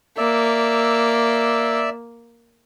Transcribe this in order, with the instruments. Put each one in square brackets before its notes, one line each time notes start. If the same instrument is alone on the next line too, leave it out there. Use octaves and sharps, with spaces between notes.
[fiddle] A#3 [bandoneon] D5 E5 E6